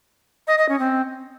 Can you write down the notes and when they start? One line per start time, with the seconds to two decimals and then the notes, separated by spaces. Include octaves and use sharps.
0.47 D#5
0.58 D#5
0.69 C#4
0.79 C4